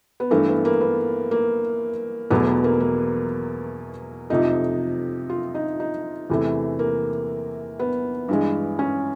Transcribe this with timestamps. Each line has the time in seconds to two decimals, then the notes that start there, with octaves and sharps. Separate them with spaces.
0.20 B3
0.31 G2 E3 A3 A#3
0.48 B3
0.65 A#3
0.81 B3
1.31 A#3
2.31 E2 B2 F#3 A3 B3
2.47 B3
2.64 A#3
2.80 A#3
4.30 F2 C3 F3 A3 D#4
5.29 F4
5.55 D#4
5.80 D#4
6.30 E2 C3 E3 A3
6.79 A#3
7.79 B3
8.29 G2 E3 G#3
8.79 C#4